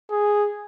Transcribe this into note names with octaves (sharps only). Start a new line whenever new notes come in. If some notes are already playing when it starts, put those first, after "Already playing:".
G#4